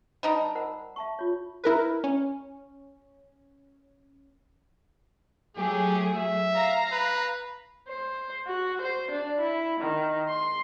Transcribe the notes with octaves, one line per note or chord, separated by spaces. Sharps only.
G3 D#4 A#5
A5
A#4 C5 F#5
E5 A5 C#6
F4 C#5
E4 A#4 B4
C#4
F#3 A3 G4 G#4
E5
F5 A#5
B4
C5
F#4
C5
D4
E4
D#3
C6